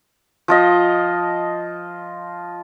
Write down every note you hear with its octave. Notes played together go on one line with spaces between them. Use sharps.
F3 F4 D#5